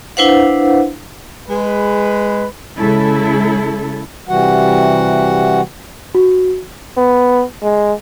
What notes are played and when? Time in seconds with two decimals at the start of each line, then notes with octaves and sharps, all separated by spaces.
0.17 D4 E4 B4 C5 F5 F#5
1.49 G#3 B4
2.78 C#3 G#3 E4 A4
4.29 C3 E3 G3 F#4 F#5
6.15 F#4
6.97 B3
7.62 G#3